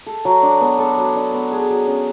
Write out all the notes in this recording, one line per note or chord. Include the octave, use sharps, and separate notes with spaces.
A4
F#3
D4
B3
A4
F#3
D4
B3
G#4
F#3
C#4